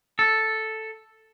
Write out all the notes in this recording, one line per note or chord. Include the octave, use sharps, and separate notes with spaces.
A4